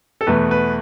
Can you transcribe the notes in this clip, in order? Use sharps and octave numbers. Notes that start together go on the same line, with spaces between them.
A4
E2 B2 A3 B4
B4